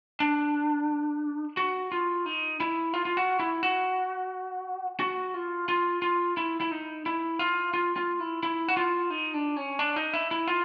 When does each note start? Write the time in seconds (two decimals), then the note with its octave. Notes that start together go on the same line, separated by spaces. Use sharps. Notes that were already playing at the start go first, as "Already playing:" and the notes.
0.20 D4
1.57 F#4
1.92 F4
2.26 D#4
2.60 E4
2.94 F4
3.05 F4
3.17 F#4
3.39 E4
3.63 F#4
5.00 F#4
5.34 F4
5.68 F4
6.02 F4
6.37 E4
6.60 E4
6.71 D#4
7.06 E4
7.39 F4
7.74 F4
7.96 F4
8.20 E4
8.43 E4
8.68 F#4
8.77 F4
9.10 D#4
9.34 D4
9.56 C#4
9.79 D4
9.96 D#4
10.14 E4
10.31 E4
10.48 F4